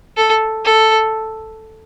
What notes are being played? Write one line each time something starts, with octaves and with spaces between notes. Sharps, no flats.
A4
A4